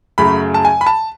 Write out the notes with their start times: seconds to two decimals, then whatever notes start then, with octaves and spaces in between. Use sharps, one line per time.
0.18 F#2 C#3 F#3 A3 B5
0.54 A5
0.65 G#5
0.81 B5
0.87 A5